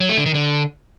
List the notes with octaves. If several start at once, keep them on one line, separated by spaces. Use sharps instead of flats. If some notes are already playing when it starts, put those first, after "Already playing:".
F#3
A3
D3
D#3
D3